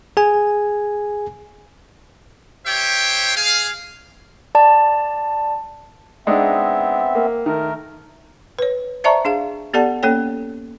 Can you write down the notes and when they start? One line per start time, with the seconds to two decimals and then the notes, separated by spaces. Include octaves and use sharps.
0.17 G#4 G#5
2.66 G4 C5 C#5 E5 G5
3.36 G#4 F5
4.55 D5 A5
6.27 G#3 B3 C4 D4 D#4 E5
7.15 A#3
7.46 D#3 A3 A#4
8.59 B4 C#5
9.04 C5 D5 E5 A5 A#5 C#6
9.25 D4 G#4 F5
9.74 B3 G4 A4 D5 F#5 A5
10.03 A#3 C#4 A4 C#5 G5